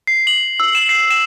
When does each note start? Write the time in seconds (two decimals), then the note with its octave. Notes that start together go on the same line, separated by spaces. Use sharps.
0.07 C7
0.27 F#7
0.60 E6
0.75 E7
0.89 C7
1.11 E7